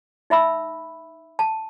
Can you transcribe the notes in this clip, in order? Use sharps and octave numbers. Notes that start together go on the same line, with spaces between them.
D#4 E5 B5 E6
A5